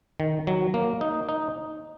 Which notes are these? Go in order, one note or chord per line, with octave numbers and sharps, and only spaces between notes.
D#3
F#3
A#3
D#4
D#4